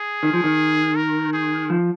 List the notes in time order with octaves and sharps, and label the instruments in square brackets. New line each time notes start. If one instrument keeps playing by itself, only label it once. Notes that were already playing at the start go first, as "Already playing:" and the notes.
Already playing: [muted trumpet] G#4
[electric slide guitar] D#3
F3
D#3
[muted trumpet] A#4
G#4
[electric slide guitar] F3